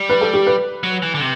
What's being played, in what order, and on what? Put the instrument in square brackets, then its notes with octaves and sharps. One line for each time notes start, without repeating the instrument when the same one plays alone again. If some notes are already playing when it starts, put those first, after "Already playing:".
Already playing: [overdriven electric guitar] G3
[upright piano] B4
A4
G4
B4
[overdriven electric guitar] F#3
E3
D3
C3